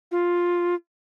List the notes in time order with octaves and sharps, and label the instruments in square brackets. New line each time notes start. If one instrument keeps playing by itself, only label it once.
[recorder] F4